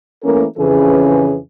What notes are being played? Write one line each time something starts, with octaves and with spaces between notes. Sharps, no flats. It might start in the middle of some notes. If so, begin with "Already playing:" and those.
E3 A3 A#3 C#4 A4 A#4
F2 C#3 E3 C#4 G#4 B4